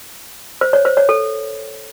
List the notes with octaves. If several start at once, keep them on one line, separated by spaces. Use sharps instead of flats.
C5
C#5
C5
C#5
A4